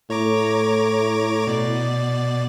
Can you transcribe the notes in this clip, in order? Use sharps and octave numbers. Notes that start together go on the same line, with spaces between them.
A2 C#5 A#5 D6
B2 D5